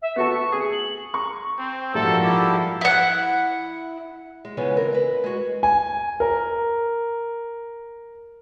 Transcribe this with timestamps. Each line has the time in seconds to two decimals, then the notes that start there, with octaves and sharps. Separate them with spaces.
0.02 E5
0.16 B3 F#4 A4 C#6
0.52 G#4
0.72 F#7
1.14 A#5 C#6
1.58 C4
1.94 A#1 G#2 F3 G3 F#4 A4 A#4 E5
2.23 G3 E4 G4 A4
2.81 E4 F#5
4.45 G#3
4.57 C#3 E3 G#3 B3 C#4 F4
4.76 C4 A#4
4.93 B4 D#5
5.24 G#3 F#4
5.63 G#5
6.20 A#4